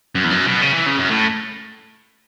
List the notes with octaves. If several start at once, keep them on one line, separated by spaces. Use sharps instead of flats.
F#2
E2
F#2
B2
C#3
E3
C#3
F#2
A2